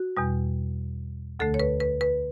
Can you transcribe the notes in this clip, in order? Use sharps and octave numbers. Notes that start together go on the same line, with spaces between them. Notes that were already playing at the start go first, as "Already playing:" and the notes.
Already playing: F#4
E2 B2 G3
D2 D3 A3 A4
C#5
B4
B4
B4